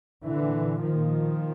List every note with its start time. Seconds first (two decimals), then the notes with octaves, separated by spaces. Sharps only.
0.26 A#2 D3 E3
0.81 A#2 D#3 F3